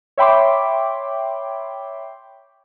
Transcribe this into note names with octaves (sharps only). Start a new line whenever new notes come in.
C#5 E5 G5 B5 C6 D6